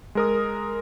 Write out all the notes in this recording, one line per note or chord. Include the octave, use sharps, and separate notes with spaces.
G#3 A#4 D#6